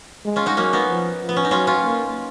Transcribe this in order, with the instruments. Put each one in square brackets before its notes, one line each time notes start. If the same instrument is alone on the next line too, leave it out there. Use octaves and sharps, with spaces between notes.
[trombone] G#3
[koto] C#4 F4
D#4 F#4
[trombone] F#3 [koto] A#3 C#4
[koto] B3 D#4
[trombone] F3
F3
[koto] B3
C#4
D#4
[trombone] F#3 [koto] C#4 F4
[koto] C#4 F4
[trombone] A#3